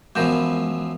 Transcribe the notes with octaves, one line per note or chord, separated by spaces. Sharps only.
F#2 E3 F3 G#3 B3 A#4 G6